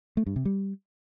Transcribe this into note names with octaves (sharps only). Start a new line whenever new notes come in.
A3
G2
C3
G3